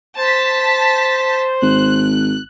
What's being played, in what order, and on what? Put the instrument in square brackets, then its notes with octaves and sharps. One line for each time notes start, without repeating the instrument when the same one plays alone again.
[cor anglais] C5 [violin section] A5 B6
[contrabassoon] G#1 [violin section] F#6